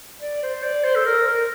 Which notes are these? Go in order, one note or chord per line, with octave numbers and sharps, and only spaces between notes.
D5
C5
D5
C5
A4
A#4
A#4